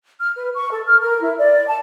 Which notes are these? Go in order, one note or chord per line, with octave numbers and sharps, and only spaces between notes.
F6
B4
C#6
A4
F6
A#4
E4
D5
A5